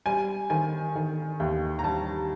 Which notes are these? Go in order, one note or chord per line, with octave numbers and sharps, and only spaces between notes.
G3 G#5
D#3 G#5
D#3
D#2
A#5
G3 A5